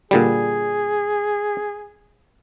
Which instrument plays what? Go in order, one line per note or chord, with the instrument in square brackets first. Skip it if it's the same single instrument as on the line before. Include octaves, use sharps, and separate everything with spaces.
[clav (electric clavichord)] A#2 D3 G3 [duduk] G#4